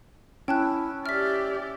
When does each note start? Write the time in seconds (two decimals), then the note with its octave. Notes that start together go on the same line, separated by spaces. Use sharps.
0.48 C#4 E4 G5 A5 F#6
1.06 G4 D5 E5 F6 B6